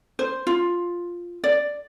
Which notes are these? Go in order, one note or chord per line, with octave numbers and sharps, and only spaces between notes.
C5
F4
D5